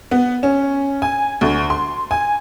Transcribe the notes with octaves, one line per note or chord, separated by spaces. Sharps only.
B3
C#4
G#5
D2
C6
G#5